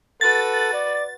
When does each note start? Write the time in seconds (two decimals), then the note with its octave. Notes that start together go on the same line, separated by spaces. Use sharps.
0.21 F#4 A4 B4 A6
0.73 D5